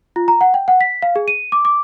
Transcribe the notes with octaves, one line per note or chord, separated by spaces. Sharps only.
F4
A#5
F#5
G5
F#5
B6
F5
G#4
D#7
D6
D6